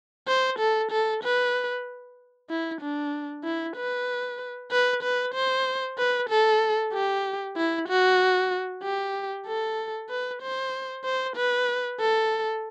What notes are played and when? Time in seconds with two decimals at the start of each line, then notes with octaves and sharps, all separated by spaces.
0.28 C5
0.59 A4
0.91 A4
1.24 B4
2.50 E4
2.81 D4
3.44 E4
3.76 B4
4.72 B4
5.03 B4
5.34 C5
5.98 B4
6.30 A4
6.93 G4
7.57 E4
7.89 F#4
8.83 G4
9.47 A4
10.09 B4
10.42 C5
11.04 C5
11.36 B4
12.00 A4